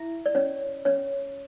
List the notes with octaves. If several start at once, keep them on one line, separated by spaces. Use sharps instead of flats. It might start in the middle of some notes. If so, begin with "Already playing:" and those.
Already playing: E4 E5
D5
C#4 C#5
C#4 C#5